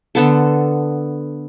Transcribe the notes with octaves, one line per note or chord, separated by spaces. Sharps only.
D3 B3 A4